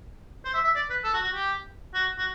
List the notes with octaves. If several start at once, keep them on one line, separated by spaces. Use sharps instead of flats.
C5
E5
E5
D5
B4
A4
F#4
F#4
G4
F#4
F#4